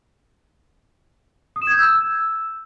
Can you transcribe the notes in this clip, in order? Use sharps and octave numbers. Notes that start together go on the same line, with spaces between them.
D#6
E7
G#6
G6
E6